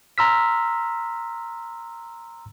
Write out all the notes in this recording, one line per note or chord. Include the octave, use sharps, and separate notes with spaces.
A#5 C6 E6 F6 B6